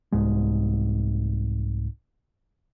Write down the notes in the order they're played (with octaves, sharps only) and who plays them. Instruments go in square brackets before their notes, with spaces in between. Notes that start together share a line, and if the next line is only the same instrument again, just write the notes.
[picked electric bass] C2 G#2 G#3